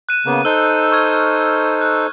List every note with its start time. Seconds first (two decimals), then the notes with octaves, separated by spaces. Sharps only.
0.09 F#6 D#7 E7
0.26 C#3 A#3 B3
0.45 D#4 A4 C5 E6 G7
0.92 C#6 F6 G#6
1.81 F#6 G6